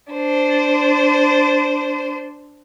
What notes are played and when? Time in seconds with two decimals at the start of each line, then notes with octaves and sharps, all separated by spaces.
0.13 D4 C5